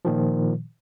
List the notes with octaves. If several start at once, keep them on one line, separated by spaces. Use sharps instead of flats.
A#2 D#3 F3